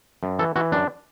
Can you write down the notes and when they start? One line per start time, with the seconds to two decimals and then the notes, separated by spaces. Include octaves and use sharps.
0.23 F#2
0.39 E3 A4
0.56 E3 F#4
0.72 F#2 D4